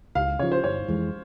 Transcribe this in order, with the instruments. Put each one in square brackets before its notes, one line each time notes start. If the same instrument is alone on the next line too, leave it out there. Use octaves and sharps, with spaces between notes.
[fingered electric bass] C#2 [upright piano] F5
[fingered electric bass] C#3 F3 [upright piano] C#5
[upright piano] C5
[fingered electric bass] G1 [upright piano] C#5
[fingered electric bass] F2 E3 G#3